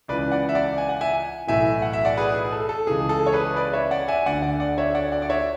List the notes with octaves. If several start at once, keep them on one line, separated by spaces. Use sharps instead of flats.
C#2 C#3 E3 B4 D5
D5 F#5
E5
D5 F#5
G#5
F#5
E5 G#5
B1 A2 E3 E5 G#5
F#5
E5
D5 F#5
G#4 B4
G#4
A4
A4
C#2 C#3 E3 G#4
A4
C#5
G#4 B4
B4 D5
C#5 E5
D5 F#5
E5 G#5
D2 D3 D5 F#5
D5 F#5
D5 F#5
C#5 E5
D5 F#5
D5 F#5
D5
C#5 E5